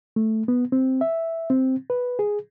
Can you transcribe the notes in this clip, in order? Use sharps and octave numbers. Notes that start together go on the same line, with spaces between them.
A3
B3
C4
E5
C4
B4
G#4